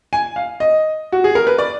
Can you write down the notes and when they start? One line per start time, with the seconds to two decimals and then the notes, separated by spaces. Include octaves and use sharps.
0.13 G#5
0.36 F5
0.60 D#5
1.12 F#4
1.24 G#4
1.35 A#4
1.47 B4
1.58 D5